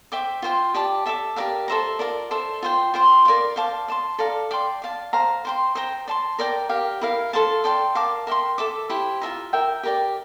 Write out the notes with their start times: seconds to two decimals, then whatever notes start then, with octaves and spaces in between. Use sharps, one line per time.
0.12 C5 E5 G5 D6
0.42 F4 C5 G5
0.74 G4 D5 A5 D6
1.06 A4 E5 A5 D6
1.36 G4 A#4 D5 F5
1.68 A4 C5 E5 A#5
1.99 F4 A#4 D5
2.31 A4 C5 E5
2.63 F4 C5 G5
2.94 F4 C5 G5 C6
3.25 A#4 D5 F5 C6
3.56 C5 F5 A5 D6
3.88 D5 A5 C6
4.19 A4 D5 F5 A#5
4.51 D5 G5 C6
4.82 D5 F5 A5
5.13 C5 F5 A#5
5.45 C5 G5 C6
5.75 C5 G5 A#5
6.08 D5 A5 C6
6.39 A#4 D5 G5 A#5
6.69 G4 A#4 F5
7.01 E4 A#4 F5
7.33 A4 C5 F5 A5
7.64 A4 D5 G5 C6
7.95 A#4 F5 A5 D6
8.27 A#4 E5 G5 C6
8.58 A4 E5 A5 D6
8.90 E4 G4 C5
9.22 F4 A4 E5 A#5
9.53 A#4 E5 G5
9.83 G4 A#4 D5 G5